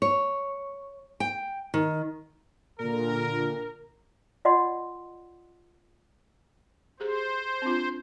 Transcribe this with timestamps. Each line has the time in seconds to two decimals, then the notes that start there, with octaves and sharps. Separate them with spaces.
0.02 C#5
1.20 G5
1.74 D#3
2.79 A#2 D3 A#4
4.45 F4 D5 D#5 F#5 C6
7.00 G4 G#4 C5
7.62 C4 D4 F4